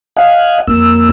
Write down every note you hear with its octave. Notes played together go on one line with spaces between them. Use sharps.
D#5 F5 F#5 G#5
F2 A#3 E6